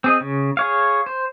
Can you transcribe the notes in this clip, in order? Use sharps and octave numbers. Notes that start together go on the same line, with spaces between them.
C4 G#4 D#5
C#3
G#4 C#5 F5
C5